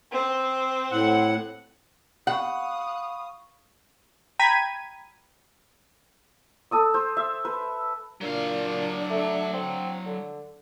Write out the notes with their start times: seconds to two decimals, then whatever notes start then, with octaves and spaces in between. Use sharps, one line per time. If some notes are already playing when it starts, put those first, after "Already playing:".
0.12 C4
0.91 A2 F#5
2.27 F5 F#5 B5 C#6 D#6
4.39 G5 A#5 B5 G#6 B6 D#7
6.71 A4 D#6 E6
6.94 C5
7.17 E5
7.45 B4
8.21 A#2 F#3 D4 F5
9.10 A3
9.53 C4
10.06 D3